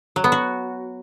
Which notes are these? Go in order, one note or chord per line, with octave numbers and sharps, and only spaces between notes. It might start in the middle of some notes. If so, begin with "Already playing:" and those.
F#3
B3
F#4